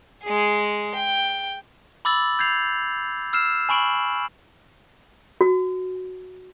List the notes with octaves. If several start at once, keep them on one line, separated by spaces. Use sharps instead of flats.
G#3 G#4
G5
B5 D6 E6 A6 F#7
G6 G#6 C7 F7
E6 F6 C7 E7
G#5 B5 C#6 D7 F#7
F#4